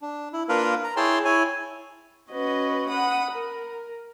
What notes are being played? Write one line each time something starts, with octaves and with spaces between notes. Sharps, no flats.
D4
E4
A#3 D4 F4 A#4 B4 F5
A#5
E4 G#4 C#5 G5 A5 C6
E4 C#5 G#5
C#4 F#4 B4 D#5
F#5 B5 D#6
A#4